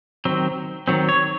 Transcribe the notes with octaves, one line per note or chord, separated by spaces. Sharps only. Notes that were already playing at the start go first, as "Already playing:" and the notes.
D#3 F#3 C4
D#3 F#3 C4
C#5